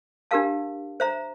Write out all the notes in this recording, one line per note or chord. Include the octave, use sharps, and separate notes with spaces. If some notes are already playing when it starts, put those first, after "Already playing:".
D4 G4 A#4 F5 A5
C5 E5 A#5